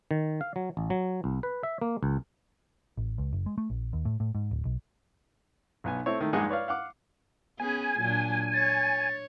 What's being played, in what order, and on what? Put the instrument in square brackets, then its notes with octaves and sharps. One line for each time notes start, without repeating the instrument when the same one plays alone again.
[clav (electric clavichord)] D#3
F5
F#3
A1
F#3
C2
B4
E5
A#3
C#2
[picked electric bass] A1
C#2
F#1
G#3
A3
A#1
D#2
A2
A2
G#2
D1
B1
[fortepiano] B1 B3 G#5
A3 C4 E4 C#5
D#3 A3
A#1 G2 G#3 D#4 F#5 G#5
B4 C#5 D5 F5
F5 F#5 D6
[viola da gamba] B3 C#4 G#4 [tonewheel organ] G#5
[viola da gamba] A#2 F#3 D4
[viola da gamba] C#5 [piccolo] A6